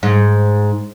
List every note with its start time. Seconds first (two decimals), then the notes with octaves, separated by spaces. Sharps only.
0.03 G#2